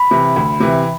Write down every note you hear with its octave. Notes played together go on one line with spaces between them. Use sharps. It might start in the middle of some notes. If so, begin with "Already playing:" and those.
Already playing: B5
C3 E3
D2
C3 E3